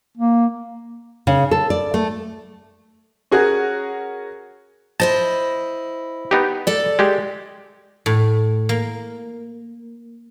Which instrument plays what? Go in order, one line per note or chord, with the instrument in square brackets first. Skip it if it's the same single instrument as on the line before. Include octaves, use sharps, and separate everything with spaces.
[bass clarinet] A#3
[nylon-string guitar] C#3
A4
D5
A3
[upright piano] C#4 F#4 G#4 A#4 F#5
[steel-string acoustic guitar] E4 C5 D#5 [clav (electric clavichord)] A5
[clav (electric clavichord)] B3 D#4 G4
[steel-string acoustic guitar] A4 D5
[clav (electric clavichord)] G#3 G4
[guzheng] A2
A#3